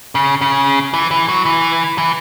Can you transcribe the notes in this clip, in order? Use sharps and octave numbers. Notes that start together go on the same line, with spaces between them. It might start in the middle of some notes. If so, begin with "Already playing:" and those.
C#3
C#3
E3
E3
F#3
E3
E3